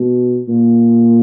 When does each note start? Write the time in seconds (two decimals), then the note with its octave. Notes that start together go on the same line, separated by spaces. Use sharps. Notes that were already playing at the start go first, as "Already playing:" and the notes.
Already playing: B2
0.49 A#2